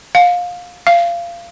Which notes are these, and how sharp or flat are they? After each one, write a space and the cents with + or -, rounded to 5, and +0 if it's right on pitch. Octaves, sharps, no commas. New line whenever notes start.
F5 +25
F5 -25